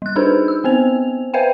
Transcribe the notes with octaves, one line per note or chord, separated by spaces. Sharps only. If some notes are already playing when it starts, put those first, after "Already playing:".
G3 F#6
D4 D#4 G#4 A4 B4 C5
E6
B3 C4 C5 F7
B4 C5 E5 F5 G5 G#5